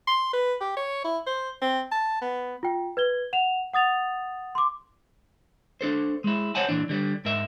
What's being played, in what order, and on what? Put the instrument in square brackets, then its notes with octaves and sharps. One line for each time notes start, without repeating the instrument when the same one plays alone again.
[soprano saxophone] C6
B4
G4
C#5
E4
C5
C4
A5
B3
[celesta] F4 G5
B4 G#6 G7
F#5 E7 F7
F#5 D#6 A6 F7
C6 D6
[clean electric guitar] D4 A4 C5
G#3 E4
C5 C#5 F#5 G#5 A5
A#2 E3 D4
D3 G3
G#2 A#4 E5